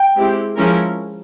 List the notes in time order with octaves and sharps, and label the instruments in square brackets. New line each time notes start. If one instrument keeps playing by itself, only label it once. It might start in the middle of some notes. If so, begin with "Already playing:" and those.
Already playing: [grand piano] G5
[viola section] G#3 C4 E4 G4
F3 G#3 C#4 E4 A#4